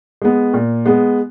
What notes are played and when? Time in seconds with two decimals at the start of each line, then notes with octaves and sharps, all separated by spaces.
0.22 G#3 B3
0.54 A#2
0.86 G#3 B3